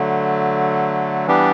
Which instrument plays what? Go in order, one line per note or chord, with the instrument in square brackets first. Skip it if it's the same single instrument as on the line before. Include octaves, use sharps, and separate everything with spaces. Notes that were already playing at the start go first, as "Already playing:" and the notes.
Already playing: [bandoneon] D3 F#3 A3
E3 G3 B3 D4 G4